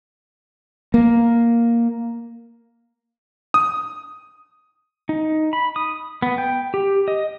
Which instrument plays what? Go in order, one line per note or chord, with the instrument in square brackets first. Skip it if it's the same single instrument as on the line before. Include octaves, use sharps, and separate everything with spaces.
[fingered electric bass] A#3
[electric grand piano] D#6
[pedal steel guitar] D#4
B5
D#6
B3
G5
G4
D#5